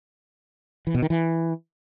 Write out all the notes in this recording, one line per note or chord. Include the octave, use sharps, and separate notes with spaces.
E3
B2
D#3
E3